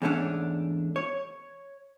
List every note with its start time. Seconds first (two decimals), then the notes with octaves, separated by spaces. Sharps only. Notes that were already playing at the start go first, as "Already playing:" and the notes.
0.02 E2 G#2 G#3 A3 C#4 D4
0.96 C#5